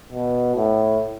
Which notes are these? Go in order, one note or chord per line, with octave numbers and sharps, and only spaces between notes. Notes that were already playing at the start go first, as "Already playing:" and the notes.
B2
A2